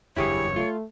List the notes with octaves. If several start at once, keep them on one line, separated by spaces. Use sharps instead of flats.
F#1 E2 G2 E4 G4 G#4 C#5
A3 F4